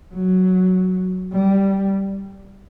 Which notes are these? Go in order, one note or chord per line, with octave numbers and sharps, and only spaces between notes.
F#3
G3